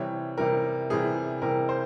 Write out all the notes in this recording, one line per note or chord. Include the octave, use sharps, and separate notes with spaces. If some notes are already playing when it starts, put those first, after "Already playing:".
Already playing: C3 E3 G3 C#5
C3 E3 G3 A#4
C3 E3 G3 G#4
C3 E3 G3 A#4
C5